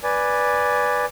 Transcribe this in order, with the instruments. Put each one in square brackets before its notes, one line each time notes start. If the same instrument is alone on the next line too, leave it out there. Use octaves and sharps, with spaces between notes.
[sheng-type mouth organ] B4 D5 G#5